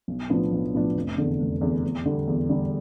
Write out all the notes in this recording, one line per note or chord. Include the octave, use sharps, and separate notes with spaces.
B1
A2 F3 B3 D4
B1
A2 F3 B3 D4
F1
E2 D3
F1
E2 D3
E2
D3 G3
E2
D3 G3